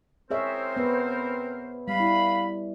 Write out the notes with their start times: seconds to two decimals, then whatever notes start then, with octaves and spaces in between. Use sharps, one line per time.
0.31 C4 G#4 A#4 C5 C#5 E5
0.77 B3 B4
1.88 G3 F5 B5
2.00 E4